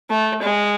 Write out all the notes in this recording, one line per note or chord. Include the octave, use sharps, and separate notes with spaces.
A3
G#3